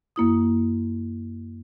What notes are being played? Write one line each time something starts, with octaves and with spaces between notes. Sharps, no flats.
F#2 A#3 E4 D#6